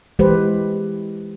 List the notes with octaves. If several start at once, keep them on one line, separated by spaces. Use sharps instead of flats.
E3 G#3 G4 B4 C5